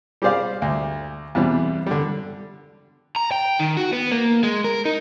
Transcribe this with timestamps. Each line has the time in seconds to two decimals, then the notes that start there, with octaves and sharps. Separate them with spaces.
0.22 G3 G4 G#4 C5 D5 F5
0.62 D2
1.35 E2 B2 G3 C4
1.86 D3 G3
3.16 A#5
3.31 G5
3.59 D#3
3.77 F#4
3.93 B3
4.12 A#3
4.43 G#3
4.64 A#4
4.85 D#4